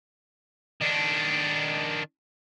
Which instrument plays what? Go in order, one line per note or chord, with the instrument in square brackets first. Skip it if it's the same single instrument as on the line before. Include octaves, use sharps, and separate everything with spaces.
[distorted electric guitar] D#3 D4